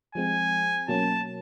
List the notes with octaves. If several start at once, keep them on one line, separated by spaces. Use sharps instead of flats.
F3 G#3 C4 G#5
B2 F#3 A#3 C#4 A5